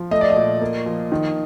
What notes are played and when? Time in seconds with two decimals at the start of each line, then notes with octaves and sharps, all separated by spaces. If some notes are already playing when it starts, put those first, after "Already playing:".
Already playing: F3
0.11 A3 D#5
0.21 D5
0.30 D#5
0.36 A#2
0.61 A#3
0.86 F3
1.12 D#3